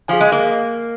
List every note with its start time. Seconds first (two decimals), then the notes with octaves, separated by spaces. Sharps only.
0.08 F3 G#4 F5 G#5
0.21 G#3
0.32 A#3